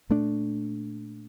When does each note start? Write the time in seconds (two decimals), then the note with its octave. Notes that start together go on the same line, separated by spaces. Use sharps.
0.09 A#2 A3 D4